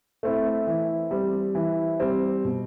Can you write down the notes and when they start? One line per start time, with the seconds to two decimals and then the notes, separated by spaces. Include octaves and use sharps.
0.23 A3 C4 E4
0.67 E3
1.11 G3 C4
1.55 E3
2.00 G3 C4
2.44 B2